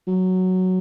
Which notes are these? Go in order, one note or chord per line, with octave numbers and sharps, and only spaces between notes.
F#3